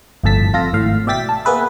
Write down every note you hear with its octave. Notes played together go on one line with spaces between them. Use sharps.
G1 F2 A2 A4 A5 B6
F2 F4 A4 A#6
G#1 A2 F5
B2 D5 E5 G5 A6 B6
A5
A#3 B3 G#4 B4 E5